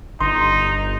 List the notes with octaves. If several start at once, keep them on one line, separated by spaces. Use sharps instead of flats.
G1 D#4 C6